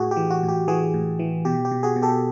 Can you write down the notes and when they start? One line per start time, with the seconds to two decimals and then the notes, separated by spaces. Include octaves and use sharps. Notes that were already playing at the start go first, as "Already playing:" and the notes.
Already playing: A2 F#4 G#4
0.11 G4
0.16 E3
0.30 F#4
0.43 A2
0.48 G4
0.68 E3 F#4 G#4
0.94 A2
1.19 E3
1.45 B2 G4
1.65 G4
1.71 B2
1.83 F#4 G#4
1.96 B2
2.02 G4 A4